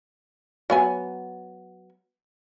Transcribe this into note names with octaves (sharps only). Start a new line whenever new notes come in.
F#3 B3 G#5